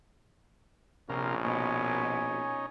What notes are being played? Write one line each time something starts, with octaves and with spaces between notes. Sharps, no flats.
A#1 C3 C#4 F4 A#4
B2 C#4 D#4 G#5